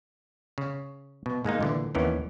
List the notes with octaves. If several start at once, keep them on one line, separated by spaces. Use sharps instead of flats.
C#3
B2
G#2 G#3 A#3 D#4
A#2 D3 E3
D#2 E3 B3 C#4 A#4